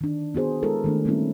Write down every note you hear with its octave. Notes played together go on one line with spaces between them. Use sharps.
D#3 D4
B3 F#4 G#4 C5
G#3 E4 A4 A#4
D#3 A3 D4
G3 A3 A#3 C4 C#4 E4